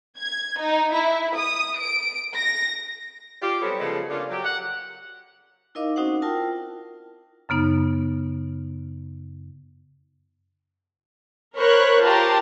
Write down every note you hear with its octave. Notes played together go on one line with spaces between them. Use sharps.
G#6
D#4
E4
D#6
D7
A#6
F4 G4 D5
F#3 G3 B3 C4 A4 C#5
C#3 F3 G#3 B3 A4
C#3 A#3 D4 F4
F#3 G4
F#5
D#4 E4 A#4 D#5 F5 D6
C4 C#4 D#4 F#4 C5 F#5
E4 F4 A#4 G5 A5
F#2 C#3 B3 D#4
A#4 C5 C#5 B5 C#6 F#6
F4 G4 A#4 A5 A#5 C6